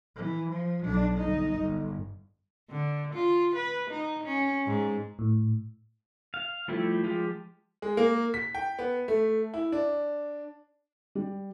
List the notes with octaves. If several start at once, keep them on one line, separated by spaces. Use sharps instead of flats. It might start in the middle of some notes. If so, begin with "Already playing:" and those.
E3
F3
B1 D4
G1 D#4
G1
D3
F4
B4
D#4
C#4
G#2
A2
F5
F3 G3 A3 E4 G4
F3 G#3 F4 G4
G#3
A#3
B6
G5
B3
A3
E4
D4
G3